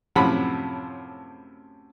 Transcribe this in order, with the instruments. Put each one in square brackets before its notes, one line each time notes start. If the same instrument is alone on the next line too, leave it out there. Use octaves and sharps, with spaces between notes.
[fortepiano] F#2 A2 C3 F3 F#5 B5